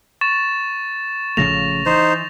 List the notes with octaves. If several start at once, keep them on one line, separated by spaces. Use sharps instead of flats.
C#6 A6 E7
A1 C#3 F3 A3 A#6 F7
E3 D#4 C5